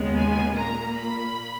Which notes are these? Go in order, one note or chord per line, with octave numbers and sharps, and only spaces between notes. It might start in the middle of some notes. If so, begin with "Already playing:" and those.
Already playing: D#2 C#3 G#3 B3
G#5
A#2 A#3 A#5
B5